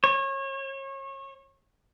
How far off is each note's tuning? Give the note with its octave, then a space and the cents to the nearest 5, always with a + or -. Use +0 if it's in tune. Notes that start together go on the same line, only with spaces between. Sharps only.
C#5 -30